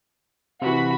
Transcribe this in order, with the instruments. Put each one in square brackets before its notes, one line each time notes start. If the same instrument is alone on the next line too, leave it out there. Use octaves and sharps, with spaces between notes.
[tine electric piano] C3 E3 [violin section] F#4 B5